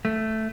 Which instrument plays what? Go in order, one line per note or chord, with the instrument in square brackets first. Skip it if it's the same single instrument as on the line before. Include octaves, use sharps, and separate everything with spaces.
[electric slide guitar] A3